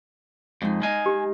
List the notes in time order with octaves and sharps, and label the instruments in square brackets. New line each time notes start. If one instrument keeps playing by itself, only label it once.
[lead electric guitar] F2 [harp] G#3 D#4
[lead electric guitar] G#3 G#5 [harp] D#4 D#5 F5
[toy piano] G4